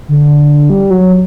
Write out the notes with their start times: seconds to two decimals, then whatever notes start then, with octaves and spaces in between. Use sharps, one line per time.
0.09 D3
0.70 G3
0.90 F#3